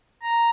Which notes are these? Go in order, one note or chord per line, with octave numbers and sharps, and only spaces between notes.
A#5